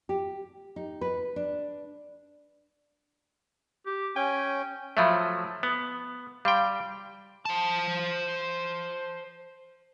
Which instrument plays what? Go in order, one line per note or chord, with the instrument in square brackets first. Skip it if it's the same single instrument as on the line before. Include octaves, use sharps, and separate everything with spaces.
[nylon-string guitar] G4
D#4
B4
D4
[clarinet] G4
[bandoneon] C#4 [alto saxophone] G5 [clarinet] G#5
[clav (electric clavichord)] F3 F#3 A3 [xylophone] E5 F5 B5
[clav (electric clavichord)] B3 [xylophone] D#6
[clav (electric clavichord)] G3 G5 [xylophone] F5 C6
[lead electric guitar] C5 A5